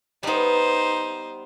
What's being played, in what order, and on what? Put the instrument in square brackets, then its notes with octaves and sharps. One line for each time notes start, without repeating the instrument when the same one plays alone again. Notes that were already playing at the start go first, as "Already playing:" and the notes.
[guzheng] G3 B3 [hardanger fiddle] D#4 C5